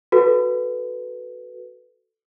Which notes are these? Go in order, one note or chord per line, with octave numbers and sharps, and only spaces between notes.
F#4 A4 B4